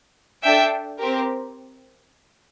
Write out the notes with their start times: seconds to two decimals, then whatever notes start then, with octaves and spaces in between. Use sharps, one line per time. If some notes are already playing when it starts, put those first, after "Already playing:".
0.43 D4 A4 E5 G5
0.99 C4 G4 A#4